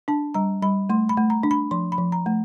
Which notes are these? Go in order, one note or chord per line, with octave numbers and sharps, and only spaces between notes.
D4 A5
G3 A#5
G3 B5
A3 C6
B5
A3
A#5
D4
B5
F3 C6
B5
F3
A#5
A3